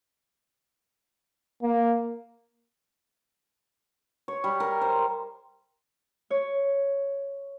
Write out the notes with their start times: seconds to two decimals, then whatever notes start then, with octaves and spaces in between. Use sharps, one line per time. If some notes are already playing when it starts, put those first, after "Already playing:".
1.63 A#3
4.28 C#5
4.44 G3
4.60 A#4
4.81 C5
6.30 C#5